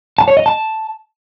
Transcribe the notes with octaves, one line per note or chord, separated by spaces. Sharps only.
A5
C#5
D#5
A5